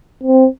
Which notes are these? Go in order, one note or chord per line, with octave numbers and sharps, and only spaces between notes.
C4